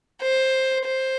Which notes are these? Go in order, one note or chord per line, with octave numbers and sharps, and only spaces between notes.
C5
C5